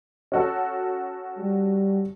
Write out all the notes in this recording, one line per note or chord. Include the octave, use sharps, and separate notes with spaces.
C#4 F#4 A4
G3